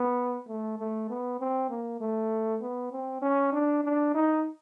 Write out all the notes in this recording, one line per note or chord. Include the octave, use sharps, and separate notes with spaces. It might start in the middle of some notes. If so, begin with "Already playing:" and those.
Already playing: B3
A3
A3
B3
C4
A#3
A3
B3
C4
C#4
D4
D4
D#4